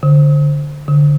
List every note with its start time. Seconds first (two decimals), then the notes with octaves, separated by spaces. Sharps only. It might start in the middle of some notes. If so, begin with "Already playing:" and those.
0.03 D3
0.88 D3